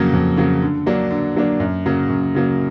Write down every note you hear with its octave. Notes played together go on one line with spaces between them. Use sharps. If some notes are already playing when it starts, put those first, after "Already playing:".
Already playing: F2 C#3 F#3 A#3
F2
C#3 F#3 A#3
D3
F#3 A#3 D4
D3
F#3 A#3 D4
F#2
C#3 F#3 A#3
F#2
C#3 F#3 A#3